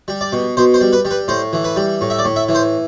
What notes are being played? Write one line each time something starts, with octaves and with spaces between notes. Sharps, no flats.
G3
D5
B2
B2 C5
C5
G3
B4
G3
B4
A2 C5
E3
B4
G3
A2
E5
D5
A2
E5
E3
C5